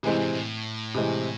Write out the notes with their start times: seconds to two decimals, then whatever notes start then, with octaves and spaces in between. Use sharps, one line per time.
0.03 A2 C3 E3 G#3 C4
0.17 G#2
0.31 A2
0.95 C3 E3 G#3 C4